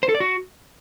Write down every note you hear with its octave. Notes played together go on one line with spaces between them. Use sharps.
C5
A4
D5
F#4